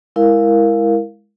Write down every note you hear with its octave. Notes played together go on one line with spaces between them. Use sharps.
G#3 E4 A#4 F5